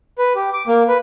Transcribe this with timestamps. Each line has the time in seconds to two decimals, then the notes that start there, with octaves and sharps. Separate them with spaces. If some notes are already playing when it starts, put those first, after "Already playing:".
0.18 B4
0.35 G4
0.53 D6
0.67 A#3
0.88 B4